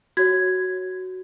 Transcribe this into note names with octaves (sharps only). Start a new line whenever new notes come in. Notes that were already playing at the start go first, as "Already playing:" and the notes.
F#4 C#5 G#6